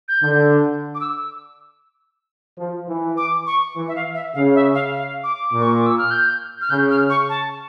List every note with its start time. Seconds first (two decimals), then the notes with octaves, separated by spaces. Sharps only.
0.08 G6
0.23 D3
0.95 D6
1.00 E6
2.58 F3
2.88 E3
3.17 D6
3.47 C#6
3.76 E3
3.88 E5
3.95 F5
4.15 E5
4.34 C#3 F5
4.55 E5
4.74 F5
4.94 F5
5.24 D6
5.53 A#2
5.60 C#6
5.73 D6
5.86 E6
5.98 F6
6.11 G6
6.61 F6
6.70 C#3 G6
6.90 F6
7.10 C#6
7.29 A5